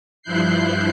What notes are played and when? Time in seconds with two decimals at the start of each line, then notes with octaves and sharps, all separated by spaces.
0.22 G2 F3 E4 F#6 G6 C7